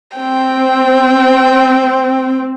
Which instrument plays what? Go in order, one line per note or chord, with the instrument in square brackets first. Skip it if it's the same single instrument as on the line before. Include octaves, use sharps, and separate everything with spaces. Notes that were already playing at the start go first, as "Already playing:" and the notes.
[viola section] C4 [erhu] G5